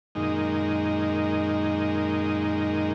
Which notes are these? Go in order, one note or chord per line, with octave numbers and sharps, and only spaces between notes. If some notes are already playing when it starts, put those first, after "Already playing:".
F#2 A#2 D#3 G#3 D#4